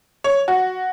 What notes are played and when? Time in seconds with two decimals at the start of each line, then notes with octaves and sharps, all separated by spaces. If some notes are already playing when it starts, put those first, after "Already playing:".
0.24 C#5
0.48 F#4